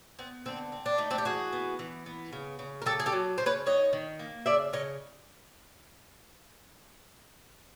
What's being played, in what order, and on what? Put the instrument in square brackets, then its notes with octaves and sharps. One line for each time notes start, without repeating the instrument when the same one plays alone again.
[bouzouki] B3 C4
D3 C4
C4
D4
A3 D#4
C4 D4
G4
E3 F#4 G#4
B3
E3
B3
C#3
C#3
A#4
C#3 G4 A4
G#4
G4 A4
F#3
C#3 C5
B4 C#5
D#3 C#5 D#5
D#3
A#3
C#3 D5 E5
C#3 C#5 D#5